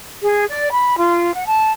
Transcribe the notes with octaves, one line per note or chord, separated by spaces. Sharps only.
G#4
D5
B5
F4
F#5
A5